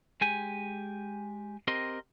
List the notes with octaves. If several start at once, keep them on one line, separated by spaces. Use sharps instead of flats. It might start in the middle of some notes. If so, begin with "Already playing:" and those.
G#3 G4 G#5
C4 G4 A#4 D#5 C6